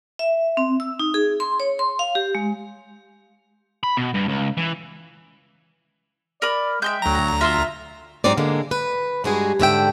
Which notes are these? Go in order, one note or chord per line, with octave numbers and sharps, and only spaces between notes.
E5
C4
E6
D#4
G#4
C6
C#5
C6
F5
G4
G#3
B5
B2
G2
C#2
E3
A#4 D5 B5
G#3 E5 G5 G6
D2 F#3 A#5
F4 E5 C6 E6
G#2 F#3 C4 D#4 D5
D3 G#3 A#3
B4
G2 G#3 F#4 G#4
G#2 D3 E5 G5